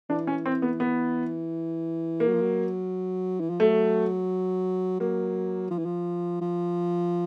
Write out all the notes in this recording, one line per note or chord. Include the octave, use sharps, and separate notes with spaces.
E3 D4
C#4
C4
B3
B3
A#3
F#3
F3
F#3
E3
F3
F#3 A3
F#3 A#3
F3
E3
F3
F3